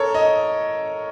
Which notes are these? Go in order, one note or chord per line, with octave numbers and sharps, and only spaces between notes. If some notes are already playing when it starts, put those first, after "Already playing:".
Already playing: A4 A#4 C#5
D#5